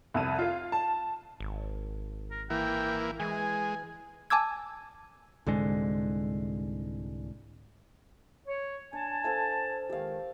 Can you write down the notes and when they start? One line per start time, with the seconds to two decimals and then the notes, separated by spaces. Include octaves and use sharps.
0.14 C2 F2 D#7
0.39 F4 F5
0.72 A5
1.40 G#1
2.31 A#4
2.50 E3 A#3 G5
3.20 E3 G#3 G#5
4.30 G#5 A5 D6 E6 G#6
5.46 C2 G#2 D3 G#3
8.46 C#5
8.93 D4 G#5 A5
9.24 A4 C5 F5
9.90 C#2 D#3 G4 F5